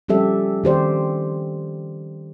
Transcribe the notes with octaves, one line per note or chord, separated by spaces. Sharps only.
F3 G3 C#4 G4 A4 E5
D#3 G4 C5 D5